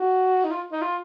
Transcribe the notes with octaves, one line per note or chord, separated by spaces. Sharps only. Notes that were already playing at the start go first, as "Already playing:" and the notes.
Already playing: F#4
D#4
F4
D#4
F4